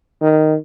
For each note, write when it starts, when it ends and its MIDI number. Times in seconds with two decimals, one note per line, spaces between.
0.21 0.56 51